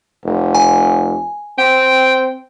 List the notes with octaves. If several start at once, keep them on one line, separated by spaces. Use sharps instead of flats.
F1
G#5
C4 G5